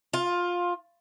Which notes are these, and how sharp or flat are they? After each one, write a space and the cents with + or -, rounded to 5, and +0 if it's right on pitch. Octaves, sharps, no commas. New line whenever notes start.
F4 +15